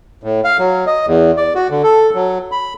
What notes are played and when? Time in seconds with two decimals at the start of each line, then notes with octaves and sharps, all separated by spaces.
0.24 A2
0.44 F5
0.59 F#3
0.87 D#5
1.07 E2
1.37 D5
1.55 F#4
1.71 D3
1.83 A4
2.15 F#3
2.52 B5